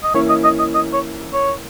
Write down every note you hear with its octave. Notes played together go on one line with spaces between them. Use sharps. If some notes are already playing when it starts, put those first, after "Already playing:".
D#5
E3 A#3 C#4 E4 C#5
D#5
D#5
D#5
D#5
C#5
C#5